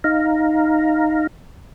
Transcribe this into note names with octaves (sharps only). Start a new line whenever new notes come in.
D#4 F5 A#5